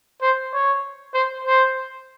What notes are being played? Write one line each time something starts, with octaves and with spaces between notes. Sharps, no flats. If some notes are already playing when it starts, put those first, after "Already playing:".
C5
C#5
C5
C5